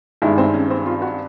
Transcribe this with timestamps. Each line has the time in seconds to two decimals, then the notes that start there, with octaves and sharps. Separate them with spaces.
0.22 G2 D#3 G#3 E4
0.38 C4
0.54 C#4
0.70 C4
0.86 F4
1.02 F#4